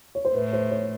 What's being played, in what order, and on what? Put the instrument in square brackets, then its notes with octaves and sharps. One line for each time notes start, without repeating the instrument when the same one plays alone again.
[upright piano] C#5
C5
[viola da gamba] A2 [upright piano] B4
[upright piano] C5
C#5